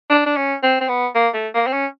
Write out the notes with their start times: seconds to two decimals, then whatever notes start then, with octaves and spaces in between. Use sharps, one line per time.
0.10 D4
0.26 D4
0.36 C#4
0.63 C4
0.81 C4
0.89 B3
1.15 A#3
1.34 A3
1.54 A#3
1.67 C4
1.73 C#4